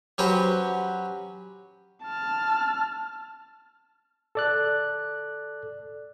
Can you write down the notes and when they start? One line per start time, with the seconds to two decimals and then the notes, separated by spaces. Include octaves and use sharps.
0.18 F#3 C#4 F#4 G4 B4 C5
2.03 A5 F6
4.35 A4 D5 F#6